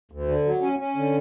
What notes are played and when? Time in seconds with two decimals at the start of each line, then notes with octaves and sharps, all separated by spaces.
0.12 D2
0.28 D3
0.45 F#3
0.61 C#4
0.79 C#4
0.96 D3